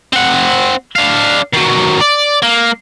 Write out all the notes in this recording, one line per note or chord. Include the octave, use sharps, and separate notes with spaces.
C4 F#5
D4 F5
D#3 F#3
D5
A#3